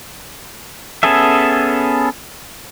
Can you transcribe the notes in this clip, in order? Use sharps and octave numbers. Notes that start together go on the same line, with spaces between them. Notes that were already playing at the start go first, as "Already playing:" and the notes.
B3 C#4 G#4 A4 E5